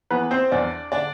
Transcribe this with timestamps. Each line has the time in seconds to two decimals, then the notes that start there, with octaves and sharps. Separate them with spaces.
0.11 E3 B3 B4
0.31 C4 C5
0.52 E2 D4 D5
0.92 D3 D4 D5